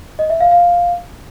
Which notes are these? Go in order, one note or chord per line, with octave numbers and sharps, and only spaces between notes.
D#5
E5
F5
F5